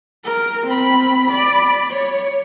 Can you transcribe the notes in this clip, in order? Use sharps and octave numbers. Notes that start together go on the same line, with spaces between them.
A#4
C4 B5
D5 B5
C#5